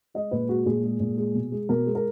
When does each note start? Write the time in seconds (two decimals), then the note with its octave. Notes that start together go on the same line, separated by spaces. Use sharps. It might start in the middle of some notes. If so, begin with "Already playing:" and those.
0.14 G#3 D#5
0.31 A#2 B4
0.48 G#3 F#4
0.66 A#2 G#4
0.83 G#3
1.00 A#2
1.18 G#3
1.35 B2
1.52 G#3
1.69 B2 A#4
1.86 G#3
1.95 A#4